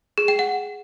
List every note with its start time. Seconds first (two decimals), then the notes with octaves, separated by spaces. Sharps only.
0.18 G#4
0.28 G5
0.39 F#5